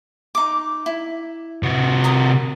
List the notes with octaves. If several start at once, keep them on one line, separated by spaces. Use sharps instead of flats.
D#4 D6
E4
C3 F#4
A#4 D#6